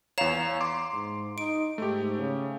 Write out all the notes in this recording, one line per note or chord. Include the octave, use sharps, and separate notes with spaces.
E2 C#5 F5 A#5 E7
C6 D6
G#2
D#4 D7
G#2 A3 G4
C#3